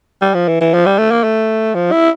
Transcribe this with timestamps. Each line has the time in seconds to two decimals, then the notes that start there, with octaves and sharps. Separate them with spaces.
0.22 G3
0.34 F3
0.48 E3
0.61 E3
0.74 F3
0.86 G3
0.98 A3
1.11 A#3
1.24 A3
1.75 F3
1.92 E4